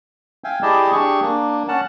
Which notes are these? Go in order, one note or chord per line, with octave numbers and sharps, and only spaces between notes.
E5 F5 G5 G#5
E4 G4 G#4 D5 D#5 A5
D4 G4 G#4 C#6
A#3 D4
C#4 F#5 A5